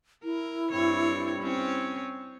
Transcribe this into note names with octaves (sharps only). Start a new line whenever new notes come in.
E4 A#4
G2 C4 C#5
C4 C#4 C#5